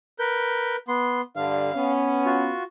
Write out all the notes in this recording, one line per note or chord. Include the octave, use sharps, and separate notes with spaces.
A#4 B4 G6
B3 C6
G2 D3 F5
B3 C#4
F4 F#4